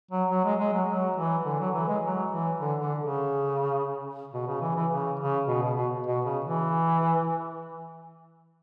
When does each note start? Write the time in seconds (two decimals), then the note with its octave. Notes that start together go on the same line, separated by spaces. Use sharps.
0.11 F#3
0.31 F#3
0.45 G#3
0.59 G#3
0.73 F#3
0.88 F#3
1.17 E3
1.45 D3
1.59 F#3
1.74 E3
1.88 G#3
2.03 F#3
2.32 E3
2.60 D3
2.80 D3
2.99 C#3
4.34 B2
4.47 C#3
4.61 E3
4.76 E3
4.91 C#3
5.20 C#3
5.48 B2
5.62 B2
5.77 B2
6.07 B2
6.25 C#3
6.45 E3